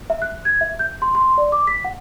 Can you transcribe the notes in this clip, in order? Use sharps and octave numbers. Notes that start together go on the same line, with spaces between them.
E5
F#6
G#6
E5
G6
C6
C6
D5
D6
B6
F#5